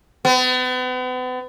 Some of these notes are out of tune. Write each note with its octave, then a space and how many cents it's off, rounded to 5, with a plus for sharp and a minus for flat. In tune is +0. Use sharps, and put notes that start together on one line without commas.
B3 +40